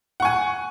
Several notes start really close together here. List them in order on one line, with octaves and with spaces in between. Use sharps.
F#5 C#6 G#5